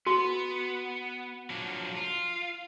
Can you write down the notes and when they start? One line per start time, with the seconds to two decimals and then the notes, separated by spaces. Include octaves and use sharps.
0.07 B3 F#4
1.50 F3 F#3 D4
1.97 F4